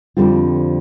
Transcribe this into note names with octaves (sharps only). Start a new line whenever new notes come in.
F2 D3 G3 C4 F4